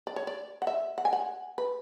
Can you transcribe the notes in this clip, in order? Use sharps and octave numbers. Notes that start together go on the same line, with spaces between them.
D5
C#5
D5
F#5
E5
F#5
G#5
F#5
B4